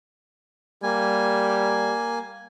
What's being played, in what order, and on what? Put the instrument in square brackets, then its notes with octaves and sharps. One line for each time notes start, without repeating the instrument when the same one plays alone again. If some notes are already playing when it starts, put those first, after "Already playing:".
[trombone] G3 [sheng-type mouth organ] A#3 G#5